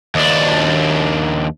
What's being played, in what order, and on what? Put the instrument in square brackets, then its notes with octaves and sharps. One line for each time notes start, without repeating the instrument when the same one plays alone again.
[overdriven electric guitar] D#2 D4